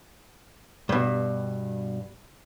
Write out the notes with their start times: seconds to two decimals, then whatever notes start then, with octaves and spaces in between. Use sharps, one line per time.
0.89 G2 B2